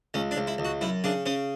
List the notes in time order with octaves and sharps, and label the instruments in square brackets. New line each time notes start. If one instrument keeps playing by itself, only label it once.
[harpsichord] C#2 C#4
D4
C#2
E4
C#2
F#4
F#2 E4
C#3 D4
C#3 C#4